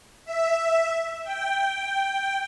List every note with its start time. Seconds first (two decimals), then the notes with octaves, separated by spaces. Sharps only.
0.25 E5
1.24 G5